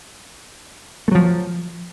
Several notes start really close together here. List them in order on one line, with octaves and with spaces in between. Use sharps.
A3 F#3 F3